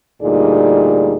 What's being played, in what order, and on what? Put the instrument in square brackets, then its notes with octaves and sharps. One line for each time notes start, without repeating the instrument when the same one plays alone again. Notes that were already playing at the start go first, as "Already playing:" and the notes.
[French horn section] D2 A#2 G3 D#4 G#4 D5